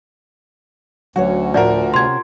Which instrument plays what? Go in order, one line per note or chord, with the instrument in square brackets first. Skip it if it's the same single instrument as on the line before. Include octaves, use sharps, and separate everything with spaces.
[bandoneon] D2 [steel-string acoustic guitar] F#3 C#4 C#5 [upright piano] F#4
[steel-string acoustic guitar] A2 [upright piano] F3 F#4 A#4 [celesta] D5
[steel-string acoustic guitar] C3 C#4 [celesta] C6 G#6